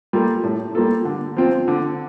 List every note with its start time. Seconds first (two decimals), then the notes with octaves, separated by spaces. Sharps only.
0.13 G3 A#3 F4 A4
0.44 A2
0.75 G3 A#3 F4 A4
1.05 D3
1.36 F3 C4 F4
1.68 D3